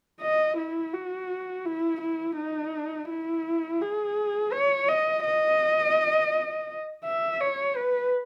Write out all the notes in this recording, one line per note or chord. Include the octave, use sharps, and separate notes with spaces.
D#5
E4
F#4
E4
E4
D#4
E4
G#4
C#5
D#5
D#5
E5
C#5
B4